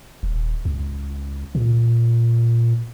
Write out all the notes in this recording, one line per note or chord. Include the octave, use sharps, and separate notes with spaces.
D#1
C#2
A#2